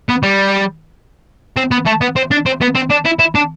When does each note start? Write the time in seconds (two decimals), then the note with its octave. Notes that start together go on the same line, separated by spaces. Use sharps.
0.09 B3
0.23 G3
1.57 C4
1.71 B3
1.86 A3
2.01 B3
2.16 C4
2.31 D4
2.46 C4
2.61 B3
2.75 C4
2.90 D4
3.05 E4
3.19 E4
3.35 D4